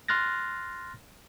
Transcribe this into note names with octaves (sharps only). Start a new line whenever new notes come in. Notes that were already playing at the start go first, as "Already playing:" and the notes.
C6 F6 F#6 A6 A#6